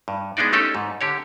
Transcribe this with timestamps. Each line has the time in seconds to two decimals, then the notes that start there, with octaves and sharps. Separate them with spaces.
0.08 G2
0.37 G#3 B3 D4 D#4 D5
0.53 A3 C#4 D#4 G4 A4
0.75 G#2
1.01 D3 G4 C#5